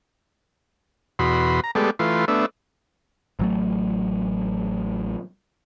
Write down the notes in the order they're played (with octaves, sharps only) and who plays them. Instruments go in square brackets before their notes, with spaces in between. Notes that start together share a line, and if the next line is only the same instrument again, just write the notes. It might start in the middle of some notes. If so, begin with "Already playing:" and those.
[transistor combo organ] E2 B2 F#4 B5 C6
A#5
G#3 A3 B3 G4 A4 D5
E3 A3 F4 B4 C6
A3 B3 D4 E5
[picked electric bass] A1 F#3 A3